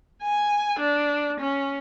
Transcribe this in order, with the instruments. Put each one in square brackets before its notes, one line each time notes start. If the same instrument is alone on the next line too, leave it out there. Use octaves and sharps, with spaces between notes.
[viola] G#5
D4
C#4